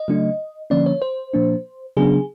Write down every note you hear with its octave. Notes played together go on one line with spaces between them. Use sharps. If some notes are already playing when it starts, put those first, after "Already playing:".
Already playing: D#5
C#3 F#3 A3 D4
D3 F3 A#3 C#4 D5
C#5
C5
A#2 F3 A#3 D4
C#3 F#3 B3 D4 G#4